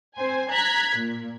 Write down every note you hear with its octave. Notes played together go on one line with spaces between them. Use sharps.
C4 C5 G#5
A#5 F#6 G#6 B6
A#2